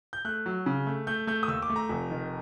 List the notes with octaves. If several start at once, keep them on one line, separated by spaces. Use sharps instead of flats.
G6
A3 F#6
F#3
C#3
A3
A3 G6
A3 G6
D#6
D#2 E6
D6
A3
A#5
F1
D#3